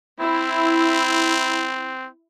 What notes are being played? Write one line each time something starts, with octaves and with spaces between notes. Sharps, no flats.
C4 E4